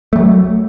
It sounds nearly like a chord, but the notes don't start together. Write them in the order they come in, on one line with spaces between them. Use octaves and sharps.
A3 G3 F#3